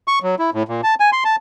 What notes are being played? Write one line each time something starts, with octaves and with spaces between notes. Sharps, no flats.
C#6
F#3
E4
A2
A#2
A5
G#5
C6
A5